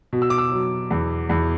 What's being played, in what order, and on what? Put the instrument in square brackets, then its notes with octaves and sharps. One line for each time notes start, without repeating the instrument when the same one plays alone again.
[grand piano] B2
E6
D6
E6
F#3
E2
E2